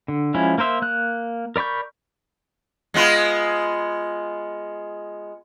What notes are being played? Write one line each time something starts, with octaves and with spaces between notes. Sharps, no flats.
D3
F3 G#3 C#4 E4
A#3 A#4 C5 E5
A#3 F#6
A#4 D5 B5 C#6 G6
G#3 B3 F4